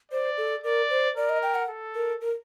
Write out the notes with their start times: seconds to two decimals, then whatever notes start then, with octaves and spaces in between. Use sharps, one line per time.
0.11 C5 D5
0.37 A4
0.64 A#4 D5
0.90 C5
1.16 A#4 D5
1.29 D#5
1.42 G5
1.55 F#5
1.69 A4
1.95 A#4
2.21 A#4